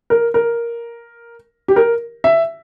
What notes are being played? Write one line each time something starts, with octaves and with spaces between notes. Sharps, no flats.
A#4
A#4
G4
A#4
E5